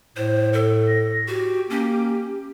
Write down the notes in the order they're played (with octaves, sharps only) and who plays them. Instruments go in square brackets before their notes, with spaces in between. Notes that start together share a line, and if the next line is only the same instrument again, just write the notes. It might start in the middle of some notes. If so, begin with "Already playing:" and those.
[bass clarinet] A2 [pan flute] C5
[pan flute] A4
[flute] A#6
[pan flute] F#4 [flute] G4
[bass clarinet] A#3 [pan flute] C#4